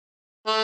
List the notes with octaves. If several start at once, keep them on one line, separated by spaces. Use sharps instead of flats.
A3